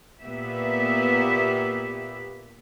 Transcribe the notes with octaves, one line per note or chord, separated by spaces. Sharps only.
A#2 A#3 B3 G4 B4 E5